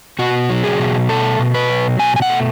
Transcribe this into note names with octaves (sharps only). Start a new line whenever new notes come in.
B2 F#4
F#3
G#4
B2
A3 A4
B2
B4
F#3
B2 G#5
G#5
F#5
A3